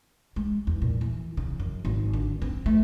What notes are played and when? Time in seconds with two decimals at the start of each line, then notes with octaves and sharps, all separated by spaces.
0.36 G#3
0.67 E2
0.82 A#2
1.01 E3
1.37 C#3
1.60 F#2
1.85 G#1
2.13 D3
2.42 C4
2.66 A3